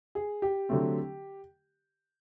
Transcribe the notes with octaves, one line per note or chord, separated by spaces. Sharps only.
G#4
G4
D3 F#3 A3 C4